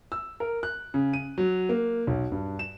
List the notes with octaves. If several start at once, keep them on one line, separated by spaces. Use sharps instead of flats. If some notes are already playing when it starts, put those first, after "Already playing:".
E6
A#4
F#6
C#3
D#7
F#3
A#3
B1
G2
E7